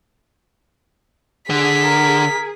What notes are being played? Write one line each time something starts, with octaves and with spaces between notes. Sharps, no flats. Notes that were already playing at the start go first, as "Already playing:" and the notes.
D3 G#4 B6
A#4